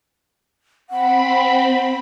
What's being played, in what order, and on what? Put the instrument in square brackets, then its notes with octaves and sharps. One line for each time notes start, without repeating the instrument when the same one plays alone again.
[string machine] C4 B5 [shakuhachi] F#5